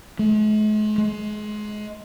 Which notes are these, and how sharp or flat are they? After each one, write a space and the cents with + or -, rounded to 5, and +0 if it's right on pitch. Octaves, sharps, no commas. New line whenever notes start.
G#3 +45
G#3 +25